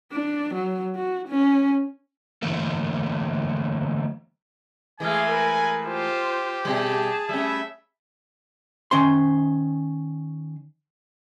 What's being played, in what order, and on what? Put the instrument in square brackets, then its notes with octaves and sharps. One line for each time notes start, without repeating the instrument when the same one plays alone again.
[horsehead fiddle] D4
F#3
F#4
C#4
[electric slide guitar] D3 E3 F#3 A3 A#3 A4
[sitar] E3 G#3 A3 [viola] G#4 F5 [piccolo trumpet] G#5
[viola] A#4 B4
[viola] F4 C5 [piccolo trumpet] G4
[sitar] B2 G3 [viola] G#4 A5
[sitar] G3 A3 C#4 [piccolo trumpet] E5
[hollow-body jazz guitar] D#3 C#4 C5 C6